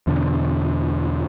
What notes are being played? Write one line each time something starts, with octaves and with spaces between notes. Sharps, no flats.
E2 B2 D3